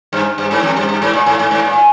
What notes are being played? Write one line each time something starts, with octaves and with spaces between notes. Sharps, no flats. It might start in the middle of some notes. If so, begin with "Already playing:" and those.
G2
G2
G#2
F2
G2
G2
G#2
A#2
G#2
G#2
G#2
A#2